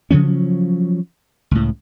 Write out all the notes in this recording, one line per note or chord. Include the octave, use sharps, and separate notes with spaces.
C#3 F3 F#3 C#4
C#2 A2